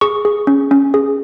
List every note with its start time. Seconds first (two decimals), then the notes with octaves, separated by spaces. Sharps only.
0.01 G#4 C#6
0.25 G#4
0.47 C#4
0.71 C#4
0.94 G#4